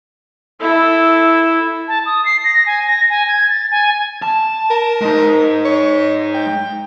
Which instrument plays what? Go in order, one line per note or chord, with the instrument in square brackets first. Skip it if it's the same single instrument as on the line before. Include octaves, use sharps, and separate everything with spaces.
[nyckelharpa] E4 A4
[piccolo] A5
D#6
C7
A#6
G#5
A#6
G#5
G#6
A6
G#5
[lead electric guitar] A5
[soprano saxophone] A#4
[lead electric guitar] G#3 D#4
[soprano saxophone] C#5
G5